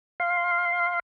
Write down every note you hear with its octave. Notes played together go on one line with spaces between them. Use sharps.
F5 C6